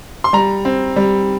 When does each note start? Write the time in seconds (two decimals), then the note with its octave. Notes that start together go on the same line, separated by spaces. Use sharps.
0.24 C6
0.33 G3 A#5
0.65 C4
0.96 G3